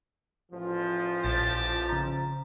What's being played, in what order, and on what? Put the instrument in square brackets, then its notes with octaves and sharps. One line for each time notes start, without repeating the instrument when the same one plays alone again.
[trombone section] A1 F3
[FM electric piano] A#1 [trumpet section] G4 A5
[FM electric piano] C#3 A#5